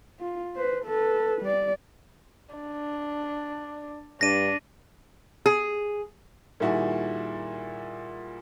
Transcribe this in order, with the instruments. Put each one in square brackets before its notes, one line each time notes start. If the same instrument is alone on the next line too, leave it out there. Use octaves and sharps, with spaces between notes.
[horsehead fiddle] F4
B4 C5
A4 B4
G3 D5
[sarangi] D4
[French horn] G2 [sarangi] D4 [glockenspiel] A#6 D#7
[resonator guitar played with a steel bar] G#4
[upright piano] A#2 D#3 G3 E4 F#4 G#4